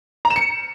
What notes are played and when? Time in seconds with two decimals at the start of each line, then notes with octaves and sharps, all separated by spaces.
0.25 A#5
0.30 E7
0.36 C#7